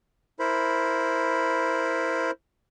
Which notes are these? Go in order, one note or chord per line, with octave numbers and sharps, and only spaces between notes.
E4 A#4 C5 B5